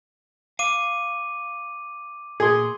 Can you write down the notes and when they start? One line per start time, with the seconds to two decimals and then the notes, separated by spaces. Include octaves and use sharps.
0.59 F5 D6 D#7
2.40 A#2 G#4 C6